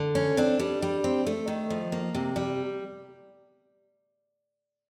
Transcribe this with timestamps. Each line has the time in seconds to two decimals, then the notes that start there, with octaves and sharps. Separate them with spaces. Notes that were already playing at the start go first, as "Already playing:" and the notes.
Already playing: D3
0.15 C#4
0.37 C4 D4
0.59 G3
0.82 G3
1.04 C4
1.27 A3
1.48 D#3
1.70 F3
1.92 A#3
2.15 C3
2.36 G3